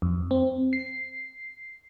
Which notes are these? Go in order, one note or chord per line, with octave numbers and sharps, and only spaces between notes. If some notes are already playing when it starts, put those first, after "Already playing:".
F2
C4
C7